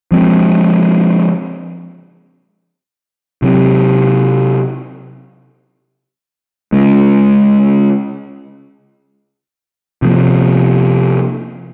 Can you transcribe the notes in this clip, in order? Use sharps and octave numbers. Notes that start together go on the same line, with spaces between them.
F3 G#3 C4
C3 F#3 C4
C#3 G#3 C#4
C3 F3 A#3